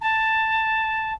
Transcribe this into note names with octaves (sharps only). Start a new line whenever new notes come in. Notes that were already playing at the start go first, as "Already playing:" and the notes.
A5